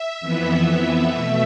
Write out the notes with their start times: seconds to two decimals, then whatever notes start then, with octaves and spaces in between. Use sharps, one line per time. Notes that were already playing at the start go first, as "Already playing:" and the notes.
Already playing: E5
0.20 F2 E3 B3
1.15 B2 A3